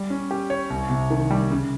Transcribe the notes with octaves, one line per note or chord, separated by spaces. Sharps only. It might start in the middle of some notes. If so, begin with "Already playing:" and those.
Already playing: G3
C#4
G4
C#5
C2
C3
D#3
G3
C#3